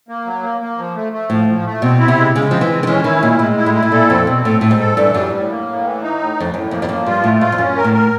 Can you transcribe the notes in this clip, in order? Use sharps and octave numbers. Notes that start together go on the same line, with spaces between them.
A#3
F#3
A#3
A#3
F3
A3
A3
A2 F3
F3
A3
B2 C4
E4
C3
G#3
C#3 G#3
F3 C4
E3
G#3
D#3
E3 C#4
D#3 E4
A#2 G#3
A2 G#3
E4
A2
E4
A2
A#2 A4
F2 C4
B2 C4
A2 A4
A2 A4
G#2
A4
G2 E3
F#2 G3
A2
A#3
A2
E3
D#4
A2
F2 A2
F#2 A2
F2 A#3
F2
F#2 F3
G2 F4
A2 A3
G#2 F4
F2
F#2 C#4
A#4
A2
A#4